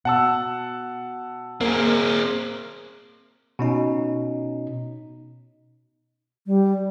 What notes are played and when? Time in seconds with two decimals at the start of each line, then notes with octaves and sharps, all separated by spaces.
0.05 B2 F#5 A5 E6
1.61 A#3 C4 G#4
3.59 B2 C#4 D#4
6.47 G3